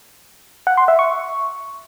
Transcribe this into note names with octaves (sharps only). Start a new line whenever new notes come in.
F#5
C6
E5
C#6